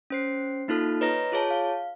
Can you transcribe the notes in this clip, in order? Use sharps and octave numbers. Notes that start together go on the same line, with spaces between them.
C#4 C5 C7
A#3 D#4 F4 A4 F6
B4 C#5 D#5 A#5 A#6
F4 G#4 C#5 A5
F5